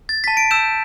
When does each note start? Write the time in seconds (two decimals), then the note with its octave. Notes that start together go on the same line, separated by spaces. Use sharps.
0.09 A6
0.24 A5 B6
0.37 D7
0.51 E6 G6 E7